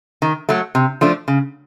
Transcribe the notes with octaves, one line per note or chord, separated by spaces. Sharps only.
D#3
F#3 A3
C3
F3 A3 D4
C#3